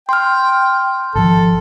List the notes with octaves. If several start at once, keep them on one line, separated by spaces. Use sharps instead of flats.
G5 C6 F6
G#1 F3 A4